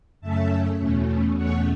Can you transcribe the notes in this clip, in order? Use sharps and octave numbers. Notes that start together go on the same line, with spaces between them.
F#2 C#3 A3 C#4 E5 A5
E2 B2 A3 C#4
E2 B2 A3 C#4 C#5 F#5